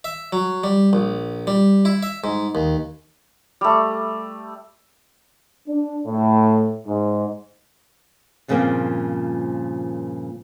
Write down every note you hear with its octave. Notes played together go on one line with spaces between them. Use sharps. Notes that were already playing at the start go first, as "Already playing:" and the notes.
E5
F#3
G3
A#1
G3
E4
E5
G#2
D#2
G3 A3
D4
A2
G#2
G2 A#2 C#3 F3 A#3 C4